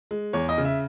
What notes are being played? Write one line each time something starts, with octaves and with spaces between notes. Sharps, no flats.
G#3
E2 C#5
D#5
C#3
E5